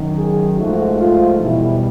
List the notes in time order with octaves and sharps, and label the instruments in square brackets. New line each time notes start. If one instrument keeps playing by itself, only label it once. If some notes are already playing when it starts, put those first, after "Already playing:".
Already playing: [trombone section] F#2 D#3 F#3
G#4
G#2 F3 A3 F#4
F4
E2 B2 G3 E4